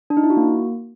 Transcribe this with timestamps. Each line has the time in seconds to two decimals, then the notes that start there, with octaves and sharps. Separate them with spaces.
0.10 D4
0.17 D#4
0.24 E4
0.30 F#4
0.37 A#3